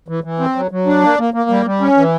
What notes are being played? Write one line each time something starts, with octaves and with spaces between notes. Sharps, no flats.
E3
E3
C4
F#3
F#3
D4
A#3
A#3
A#3
G3
G3
C#4
E3